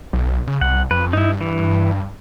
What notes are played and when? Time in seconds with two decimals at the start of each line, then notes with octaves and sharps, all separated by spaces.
0.13 B1
0.47 C#3
0.61 C2 F#5
0.91 F2 B4
1.13 G2 D#4 E4
1.41 E3